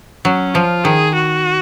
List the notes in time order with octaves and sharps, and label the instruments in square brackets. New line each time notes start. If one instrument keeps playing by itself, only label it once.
[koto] F#3 [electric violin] C#4
[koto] F3 [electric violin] F4
[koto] D#3 [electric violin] G#4
[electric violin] F#4